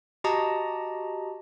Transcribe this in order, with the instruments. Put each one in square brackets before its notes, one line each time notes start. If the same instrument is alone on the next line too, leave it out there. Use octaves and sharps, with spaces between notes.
[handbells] F#4 G4 D#5 A5 A#5 D#6